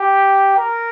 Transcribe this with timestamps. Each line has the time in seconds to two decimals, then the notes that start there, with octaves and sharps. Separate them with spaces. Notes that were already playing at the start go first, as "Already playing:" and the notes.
Already playing: G4
0.58 A#4